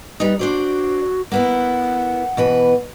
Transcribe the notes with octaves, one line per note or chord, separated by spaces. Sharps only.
G3 D#4 B4
D4 F#4 C5 D5
A#3 B3 E4 F#5
B2 E3 B4